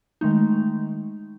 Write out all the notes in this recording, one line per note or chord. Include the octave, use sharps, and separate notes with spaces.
D#3 G#3 A3 D#4